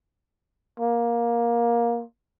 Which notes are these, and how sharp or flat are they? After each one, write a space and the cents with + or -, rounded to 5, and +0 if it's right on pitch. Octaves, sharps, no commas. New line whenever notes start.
A#3 +15